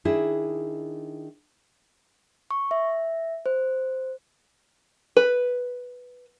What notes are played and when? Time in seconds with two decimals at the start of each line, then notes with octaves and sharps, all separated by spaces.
0.05 D#3 D4 E4 G#4
2.51 C#6
2.71 E5
3.46 C5
5.17 B4